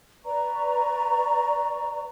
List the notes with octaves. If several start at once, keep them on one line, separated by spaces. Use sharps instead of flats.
B4 D5 A#5 C#6